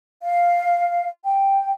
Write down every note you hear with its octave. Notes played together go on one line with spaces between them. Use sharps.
F5
G5